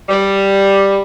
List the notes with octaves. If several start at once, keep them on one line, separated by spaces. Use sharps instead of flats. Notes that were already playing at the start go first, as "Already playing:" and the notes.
G3